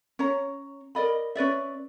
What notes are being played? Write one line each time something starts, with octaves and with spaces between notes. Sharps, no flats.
C#4 C#5 A#5
A#4 D5 D#5 B5
C#4 B4 D5 E5